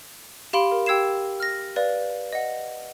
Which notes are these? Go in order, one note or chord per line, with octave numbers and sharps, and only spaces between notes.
G4 F5 B5 C6 D7
A#4
G4 G5 E6 G#6 C7 E7
F6 A#6
B4 D5 F5
D#5 F#5